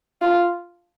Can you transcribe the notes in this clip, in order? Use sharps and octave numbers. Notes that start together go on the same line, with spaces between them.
F4